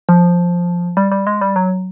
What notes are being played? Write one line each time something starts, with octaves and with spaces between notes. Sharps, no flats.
F3
G3
G3
G#3
G3
F#3